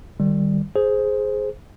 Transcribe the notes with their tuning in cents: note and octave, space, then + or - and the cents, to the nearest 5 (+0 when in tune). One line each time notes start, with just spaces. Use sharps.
D#3 -30 G3 +0
G#4 +10 C5 +0